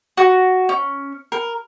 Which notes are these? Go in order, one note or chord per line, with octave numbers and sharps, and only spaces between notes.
F#4
C#4
A#4